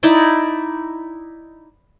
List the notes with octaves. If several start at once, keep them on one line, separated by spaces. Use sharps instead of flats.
D#4 E4 D5 D6